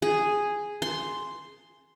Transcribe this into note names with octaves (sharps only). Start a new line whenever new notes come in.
G#4
C6